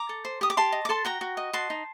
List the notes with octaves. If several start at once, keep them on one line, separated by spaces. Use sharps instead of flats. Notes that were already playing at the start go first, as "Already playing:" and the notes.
Already playing: A#5 D6
A4
C5
G4 D#6
D6
G4 A5 C6
D#5
D6
A4 A5 C6
F#4 G5 A#5
F#4
D#5
F#4 A5 C6
D#4